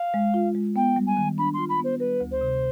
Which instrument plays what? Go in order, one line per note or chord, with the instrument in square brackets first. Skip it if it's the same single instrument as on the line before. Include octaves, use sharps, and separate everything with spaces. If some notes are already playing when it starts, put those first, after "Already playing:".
Already playing: [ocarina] F5
[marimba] G#3
F4
G#3
[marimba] B3 [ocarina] G5
[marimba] G3
[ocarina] G#5
[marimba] D#3
[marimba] D4 [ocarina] B5
[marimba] F4 [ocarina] C6
[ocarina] B5
[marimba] B3 [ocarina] C5
[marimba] G3 [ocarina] B4
[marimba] D2
[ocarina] C5
[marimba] C3